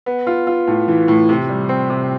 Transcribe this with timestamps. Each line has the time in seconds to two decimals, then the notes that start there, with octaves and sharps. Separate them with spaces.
0.06 B3
0.27 F4
0.47 F4
0.67 A2
0.88 E3
1.08 A2
1.29 C3
1.49 G3
1.69 C4
1.90 C3